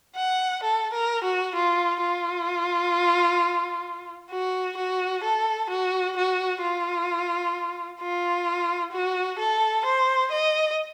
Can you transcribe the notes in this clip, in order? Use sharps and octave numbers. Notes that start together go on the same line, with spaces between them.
F#5
A4
A#4
F#4
F4
F4
F#4
F#4
A4
F#4
F#4
F4
F4
F#4
A4
C5
D#5